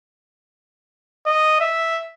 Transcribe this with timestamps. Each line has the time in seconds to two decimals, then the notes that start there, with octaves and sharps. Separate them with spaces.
1.26 D#5
1.60 E5